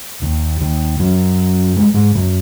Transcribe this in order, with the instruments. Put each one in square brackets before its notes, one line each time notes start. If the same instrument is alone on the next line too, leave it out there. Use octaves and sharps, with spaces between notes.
[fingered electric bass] D#2 D#3
D#2 D#3
F#2 F#3
G#3
G#2 G#3
F#2 F#3